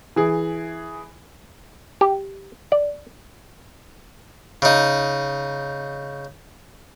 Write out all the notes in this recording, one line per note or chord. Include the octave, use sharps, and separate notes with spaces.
E3 G#4
G4
D5
C#3 D#4